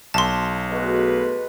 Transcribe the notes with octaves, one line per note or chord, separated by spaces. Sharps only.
B1 A5 C6
G#3 A3 B3 F#4 B4